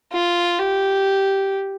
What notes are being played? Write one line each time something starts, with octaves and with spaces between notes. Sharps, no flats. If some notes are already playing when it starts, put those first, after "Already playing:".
F4
G4